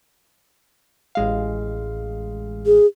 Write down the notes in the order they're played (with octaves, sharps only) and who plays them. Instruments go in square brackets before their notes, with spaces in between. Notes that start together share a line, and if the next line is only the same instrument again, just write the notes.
[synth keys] A1 G#3 F5
[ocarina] G#4